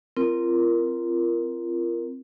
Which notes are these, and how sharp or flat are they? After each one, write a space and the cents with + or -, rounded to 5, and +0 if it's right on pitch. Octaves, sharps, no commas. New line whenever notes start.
C4 +0 F4 -30 A#4 +0